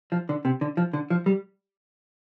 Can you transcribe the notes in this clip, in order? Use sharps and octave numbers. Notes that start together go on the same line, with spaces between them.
F3
D3
C3
D3
F3
D3
F3
G3